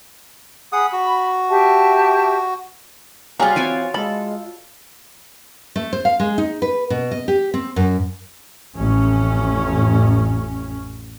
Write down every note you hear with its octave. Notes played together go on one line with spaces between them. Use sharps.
G#4 F#5 B5 D#6
F#4
G4 E5 A5
G3 F4 F#4 G#4 C#5 F5 G5 A#5
E3 C4 C#5 D5 G#5
G#3 A4 B5
A3
C5
F5
G#3
D#4
B4
B2
D#5
G4
C4
F#2
A1 F2 C#4